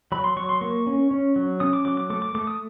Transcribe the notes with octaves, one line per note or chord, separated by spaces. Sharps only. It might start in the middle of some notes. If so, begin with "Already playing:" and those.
F#3 B5
C6
F#3 C#6
C6
A#3 C#6
C#4
C#4
F#3
C#4 D#6
D6
F#3 D6
D6
A3 D6
D6
A3 D6
D#6